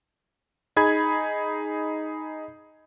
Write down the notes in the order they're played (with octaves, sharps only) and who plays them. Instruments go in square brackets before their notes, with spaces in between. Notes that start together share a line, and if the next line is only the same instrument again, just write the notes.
[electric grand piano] D#4 G#4 B5 G#6